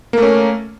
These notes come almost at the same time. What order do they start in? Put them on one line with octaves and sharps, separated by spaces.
A#3 A3 C#4